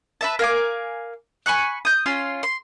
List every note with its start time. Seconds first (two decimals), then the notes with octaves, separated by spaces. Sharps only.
0.21 B4 E5 A5
0.39 A#4 F5 G#5 D6
1.46 G#5 B5 C#6 F#6
1.85 D#6 G6
2.06 C#4 F4 C6
2.43 C6